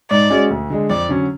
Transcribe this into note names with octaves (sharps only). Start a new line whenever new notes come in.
G#2 D5
G#3 C#4 F#4
D2
D3 G#3 D4
F2 D5
D3 F#3 C#4